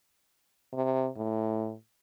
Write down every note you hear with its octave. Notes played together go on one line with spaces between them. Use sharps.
C3
A2